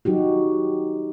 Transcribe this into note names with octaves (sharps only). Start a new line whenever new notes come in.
F#3 D#4 F#4 G4